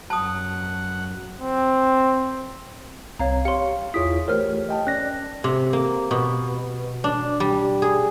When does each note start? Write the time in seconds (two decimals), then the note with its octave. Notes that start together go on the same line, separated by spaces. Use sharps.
0.10 F#2 F#3 F#5 A5 D#6
1.41 C4
3.19 C2 C4 C#5 F5 A#5
3.45 G4 C#5 F5 C6 C#7
3.94 E2 E4 F4 G#4 C#5 D#6 B6
4.28 E3 A3 G4 A#4 C5 C#5 F6
4.69 D#5 G5 A5
4.87 C#4 D5 F#6 A#6
5.44 C3
5.73 A#3
6.11 B2
7.04 D4
7.40 G3
7.82 G#4